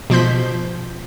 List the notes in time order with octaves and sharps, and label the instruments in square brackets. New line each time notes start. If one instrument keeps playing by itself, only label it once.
[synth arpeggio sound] B2 F3 C6 G6 B6